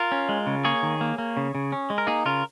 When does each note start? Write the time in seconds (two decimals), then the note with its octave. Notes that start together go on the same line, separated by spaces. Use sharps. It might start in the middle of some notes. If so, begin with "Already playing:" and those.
Already playing: F4 A#4
0.12 C#4
0.29 G#3
0.47 C#3
0.64 A#3 G#4 C#5
0.83 D#3
1.01 A#3
1.18 A#3
1.37 C#3
1.55 C#3
1.72 C#4
1.90 G#3
1.98 A#4
2.07 A#3 D#4 G#4
2.25 C#3 F4 A#4